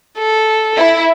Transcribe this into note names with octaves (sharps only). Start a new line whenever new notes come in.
A4
E4